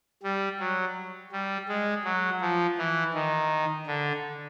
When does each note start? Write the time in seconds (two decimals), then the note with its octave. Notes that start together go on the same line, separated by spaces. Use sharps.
0.23 G3
0.60 F#3
1.32 G3
1.69 G#3
2.04 F#3
2.41 F3
2.78 E3
3.14 D#3
3.87 D3